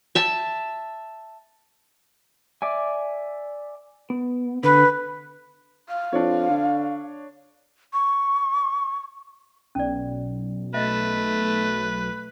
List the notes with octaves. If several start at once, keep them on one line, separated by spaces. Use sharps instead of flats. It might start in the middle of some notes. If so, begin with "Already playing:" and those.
E5 A5
D5 E5 G#5
B3
D3 B4
F5
F2 D4 C#5
D3
C#6
B1 C#4 D5
A3 B4 D#5 E5